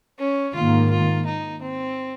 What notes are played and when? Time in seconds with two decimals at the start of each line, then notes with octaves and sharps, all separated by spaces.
0.18 C#4
0.55 G#2 D#3 A#3 F4
0.90 F4
1.26 D#4
1.62 C4